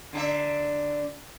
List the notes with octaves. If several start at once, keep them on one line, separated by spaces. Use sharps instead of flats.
D3 D4 E5